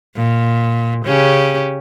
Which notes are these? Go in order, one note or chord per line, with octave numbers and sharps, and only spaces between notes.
A#2
C#3 C#4 G4